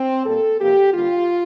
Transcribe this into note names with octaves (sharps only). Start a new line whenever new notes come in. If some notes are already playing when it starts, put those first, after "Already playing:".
Already playing: C4
A#2 G3 A#3 A4
C3 F3 A#3 G4
D3 G3 A#3 F4